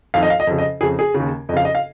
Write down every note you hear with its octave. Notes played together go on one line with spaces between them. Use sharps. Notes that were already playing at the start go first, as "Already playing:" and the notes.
F2 D#3 F5
D#5
F5
D#5
F2 C#3
D#5
F2 C#3 G#4
G#4
C#3
D#2
F2 C#3 D#5 F5
D#5
F5